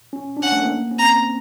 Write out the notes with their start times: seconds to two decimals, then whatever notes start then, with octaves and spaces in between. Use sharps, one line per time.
0.13 C#4
0.37 D4
0.43 C#4 F#5
0.52 A3
0.62 A#3
0.91 C#4
0.99 C4 A#5